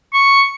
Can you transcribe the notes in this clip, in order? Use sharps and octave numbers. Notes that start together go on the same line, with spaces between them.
C#6